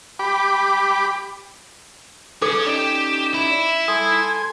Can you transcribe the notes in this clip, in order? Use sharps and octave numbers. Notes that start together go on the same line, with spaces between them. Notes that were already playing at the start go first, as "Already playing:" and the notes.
G4 B5 D6
G#4 A4 C#5 D6
C#4 D#4 G4 D5 G5 E7
E4
A4 G#5 C6 D#6 G#6